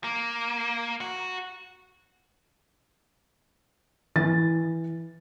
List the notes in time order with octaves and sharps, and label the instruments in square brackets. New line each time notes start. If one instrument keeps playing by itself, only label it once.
[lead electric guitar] A#3
F#4
[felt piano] E3 A6